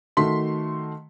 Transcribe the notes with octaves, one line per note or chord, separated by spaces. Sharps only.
D#3 A3 F#4 C6 B6